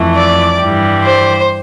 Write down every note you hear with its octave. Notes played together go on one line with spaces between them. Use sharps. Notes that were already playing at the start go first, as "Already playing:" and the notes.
Already playing: F2 E3 A3
D5
G2 E3 G3
C5